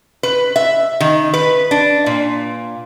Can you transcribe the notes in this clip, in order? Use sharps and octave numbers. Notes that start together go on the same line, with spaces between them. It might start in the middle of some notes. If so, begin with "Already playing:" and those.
B4
E5
D#3
B4
D4
A#2